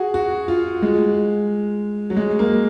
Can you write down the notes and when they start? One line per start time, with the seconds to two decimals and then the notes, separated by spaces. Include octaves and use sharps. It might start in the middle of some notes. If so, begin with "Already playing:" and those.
Already playing: F#4 G#4
0.14 F#4
0.48 F4
0.82 G#3
2.10 F#3
2.17 G#3
2.39 A#3